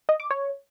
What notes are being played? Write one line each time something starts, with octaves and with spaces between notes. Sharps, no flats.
D#5
D6
C#5